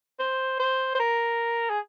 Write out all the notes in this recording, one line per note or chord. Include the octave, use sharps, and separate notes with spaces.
C5
C5
C5
A#4
G#4